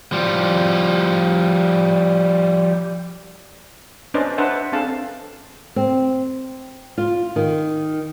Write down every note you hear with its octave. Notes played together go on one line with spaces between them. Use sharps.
F3 G3
C#4 D4 B4 C5 D5 D#5
D4 B4 C5 E5 F#5 A5
C4 D4 G#4 A4 F5 A5
C4
F4
D#3